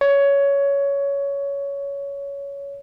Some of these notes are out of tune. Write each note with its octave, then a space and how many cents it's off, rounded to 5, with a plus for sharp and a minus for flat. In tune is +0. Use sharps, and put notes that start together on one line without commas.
C#5 +15